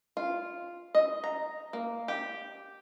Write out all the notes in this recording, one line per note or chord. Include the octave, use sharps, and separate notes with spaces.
F4
D#5
A#5
A#3
G4